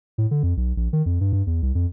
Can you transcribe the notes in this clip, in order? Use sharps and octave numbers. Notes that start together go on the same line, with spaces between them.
A2
D3
F2
B1
A#1
D#3
F2
G2
G2
E2
C2
F2